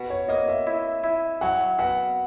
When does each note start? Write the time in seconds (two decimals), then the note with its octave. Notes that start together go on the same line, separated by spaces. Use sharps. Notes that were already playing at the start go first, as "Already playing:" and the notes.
Already playing: B2
0.10 C#5
0.29 A#3 D#5
0.48 E5
0.67 E4
1.04 E4
1.41 F#3 F#5
1.79 B2 F#5